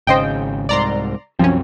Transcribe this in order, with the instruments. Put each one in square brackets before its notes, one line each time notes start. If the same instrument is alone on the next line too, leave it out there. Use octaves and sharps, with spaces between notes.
[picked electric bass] G#1 C#3 [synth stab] C5 D#5 G5
[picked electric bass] C2 G#2 [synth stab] D5 A#5 C6
[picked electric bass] C2 F#2 C4 [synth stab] F3 C#4